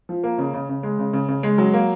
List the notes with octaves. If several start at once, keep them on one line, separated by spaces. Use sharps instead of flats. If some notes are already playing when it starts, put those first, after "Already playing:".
F3
A#3
C#3
C#3
C#3
G#3
C#3
C#3
C#3
G#3
F#3
A#3